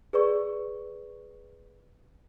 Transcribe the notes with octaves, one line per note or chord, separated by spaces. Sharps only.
G#4 B4 D5 C#6